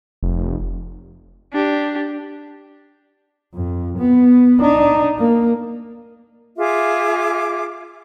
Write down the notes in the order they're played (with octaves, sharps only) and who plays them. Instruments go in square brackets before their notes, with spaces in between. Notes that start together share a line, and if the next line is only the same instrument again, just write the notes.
[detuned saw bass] F1
[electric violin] D4 G4
[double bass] F2
B3
D4 D#4
A#3
[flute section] F4 G#4 E5 D6